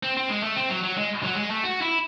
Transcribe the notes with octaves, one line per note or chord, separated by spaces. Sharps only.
C4
C4
G#3
A3
C4
F#3
F#3
G#3
F#3
G#3
A3
F#4
E4